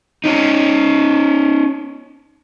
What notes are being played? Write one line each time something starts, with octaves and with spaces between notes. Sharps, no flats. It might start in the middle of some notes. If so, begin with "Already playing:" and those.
C#4 D#4